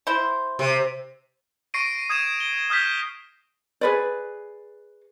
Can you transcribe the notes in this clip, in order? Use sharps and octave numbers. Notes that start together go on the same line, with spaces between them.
E4 C5
C3
C#6 A#6 C7 D7 D#7
D#6 G#6 D#7 E7
G7
D#6 F6 G6 B6
G#4 B4 D5